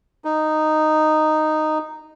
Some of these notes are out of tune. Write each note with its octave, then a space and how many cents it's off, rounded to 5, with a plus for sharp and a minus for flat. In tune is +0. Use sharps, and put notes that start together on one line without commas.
D#4 -10